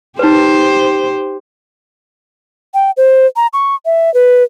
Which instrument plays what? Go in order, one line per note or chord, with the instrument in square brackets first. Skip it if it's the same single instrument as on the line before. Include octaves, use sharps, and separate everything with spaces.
[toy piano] D#4 B4 [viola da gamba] G4 C5
[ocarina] G5
C5
A#5
C#6
E5
B4